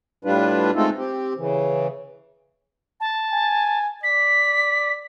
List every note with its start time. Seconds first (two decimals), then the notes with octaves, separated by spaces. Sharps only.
0.25 A2 G3 D4 F4 B4
0.75 G#3 A3 C4 D#4 F4 A4
0.97 C4 G4
1.37 C#3 E3
3.00 A5
3.33 G#5
4.04 D5 B6